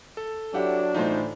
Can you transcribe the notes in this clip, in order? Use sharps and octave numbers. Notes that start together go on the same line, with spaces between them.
A4
F#3 D4 E4 G4 F#5
A2 D3 E3 D#4 F4 C5